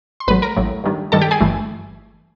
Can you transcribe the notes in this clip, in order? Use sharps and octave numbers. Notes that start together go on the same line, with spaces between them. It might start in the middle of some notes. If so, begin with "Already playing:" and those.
C6
A1 A2 F#3 B4 B5
A#4 A#5
A1 A2 F#3
G2 D#3 G3
G2 D#3 G3 A4 A5
G4 G5
G#4 G#5
G1 G2 E3 A3